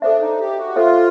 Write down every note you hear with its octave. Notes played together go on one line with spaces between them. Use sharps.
D4 A4 C5 E5
D#4
G4
F#4
F4 A4 C5 E5